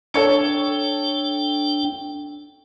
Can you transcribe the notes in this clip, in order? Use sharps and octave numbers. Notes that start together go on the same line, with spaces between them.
D4 A4 C#5 G5 C#7